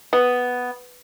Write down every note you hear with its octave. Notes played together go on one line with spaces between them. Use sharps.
B3